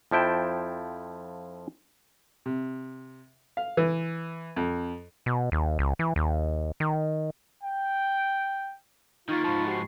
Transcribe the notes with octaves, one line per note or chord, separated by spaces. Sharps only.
F2 F3 E4 G5 A5
C3
F5
E3
F2
B2
D#2
C#2
E3
D#2
D#3
G5
D#3 A#3 D#4 F4 C#6 A6
G#2 F3 A5 B5 C#6
F#4 G4 C7